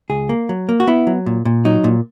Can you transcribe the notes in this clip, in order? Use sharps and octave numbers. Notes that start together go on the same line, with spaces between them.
C#2 G#4
A#3
F#3
A#3
F#4
B3 E4
F#3
A#2
A#2
F#3 D#4
A#2